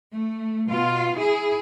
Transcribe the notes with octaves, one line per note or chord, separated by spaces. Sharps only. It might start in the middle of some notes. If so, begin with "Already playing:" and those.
A3
B2 F4
E4 G#4